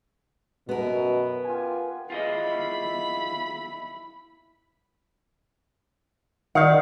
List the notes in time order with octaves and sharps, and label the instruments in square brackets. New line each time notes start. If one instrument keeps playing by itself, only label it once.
[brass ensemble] F#2 B2 [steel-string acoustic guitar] B3 A#4
[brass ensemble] F4 G4 G#5
[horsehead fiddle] E4 B5 [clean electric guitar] F4 G#4 D#5
[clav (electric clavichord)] D#3 [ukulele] D5 F5 F#5